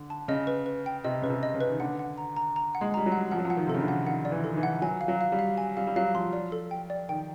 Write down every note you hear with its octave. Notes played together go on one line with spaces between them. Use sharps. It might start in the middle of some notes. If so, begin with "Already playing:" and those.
Already playing: D3
A5
C#3 D#5
B4
B4
G5
C3 D#5
C#3 B4
C3
D#5
C#3
B4
D#3
D3 F#5
F#5
A#5
A#5
A#5
F#5
G#3
G3 A#5
F#3
F#5
F3 F#5
F#3
F3
F#5
D#3
C3
C#3 A4
D3
F#5
D#3 F#5
D5
E3
A4
D#3
E3
F#5
F#3 G#5
F5
F#3
F5
G3
F5
G#5
G3 F5
G3
F#3 F5
F3 C6
D5
A4
G5
D5
D#3 G5